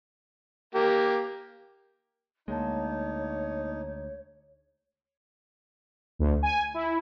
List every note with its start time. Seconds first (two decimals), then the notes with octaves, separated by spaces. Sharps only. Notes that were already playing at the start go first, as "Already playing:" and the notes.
0.75 A#3 G4
2.48 D2 G#3 A#3 D#4 C#5 A5
6.19 D2
6.43 G#5
6.74 E4